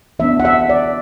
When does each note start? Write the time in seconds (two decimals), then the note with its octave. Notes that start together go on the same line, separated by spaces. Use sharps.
0.19 E3 B3 D4 E5
0.40 F#5
0.45 E5
0.70 D5